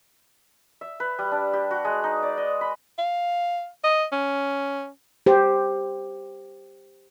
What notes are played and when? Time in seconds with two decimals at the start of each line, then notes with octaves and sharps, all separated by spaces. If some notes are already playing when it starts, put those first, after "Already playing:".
0.81 E5
1.00 B4
1.19 G3
1.32 D4
1.53 G4
1.71 F#4
1.85 G#3
2.04 D#4
2.22 D5
2.37 D#5
2.61 B5
2.98 F5
3.84 D#5
4.12 C#4
5.26 G4 C5